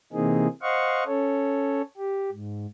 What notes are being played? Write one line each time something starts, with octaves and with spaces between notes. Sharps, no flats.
C3 E3 A#3 C4 D#4 G#4
C5 D#5 F5 F#5 C#6
C#4 A4 C#5
G4
G#2